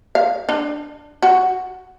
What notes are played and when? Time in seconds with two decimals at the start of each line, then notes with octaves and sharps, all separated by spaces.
0.15 F5
0.49 D4
1.22 F#4